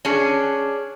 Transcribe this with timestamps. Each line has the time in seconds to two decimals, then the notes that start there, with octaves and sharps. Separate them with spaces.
0.05 C#4 D4 G#4